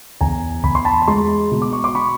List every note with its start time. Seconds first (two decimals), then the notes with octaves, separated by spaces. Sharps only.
0.21 E2 G#5 A#5
0.64 E2 B5
0.75 C6
0.85 A5 B5
1.02 B5
1.07 G#3 A#5 C6
1.52 B2
1.62 D6
1.73 C#6
1.84 C6 D6
1.95 B5 C#6